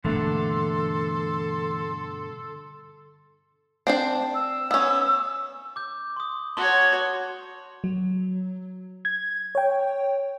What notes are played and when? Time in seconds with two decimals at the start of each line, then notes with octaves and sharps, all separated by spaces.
0.04 G2 B2 D3 E3 A3 A#3 A4 C6
3.87 C4 D4 C5
4.34 E6
4.71 B3 C#4
5.76 D6 G6
6.16 C6 D#6
6.57 F#4 C#5 A5 C6 G7
7.84 F#3
9.05 G#6
9.55 C#5 G5